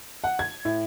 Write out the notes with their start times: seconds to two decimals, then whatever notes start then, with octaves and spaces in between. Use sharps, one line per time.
0.24 F#5
0.39 G#6
0.65 A2